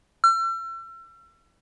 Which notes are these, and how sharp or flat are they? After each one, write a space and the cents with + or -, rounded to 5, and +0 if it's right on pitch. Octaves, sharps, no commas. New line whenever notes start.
E6 +40